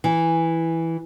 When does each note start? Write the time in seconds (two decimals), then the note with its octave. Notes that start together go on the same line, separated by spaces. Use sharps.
0.04 E3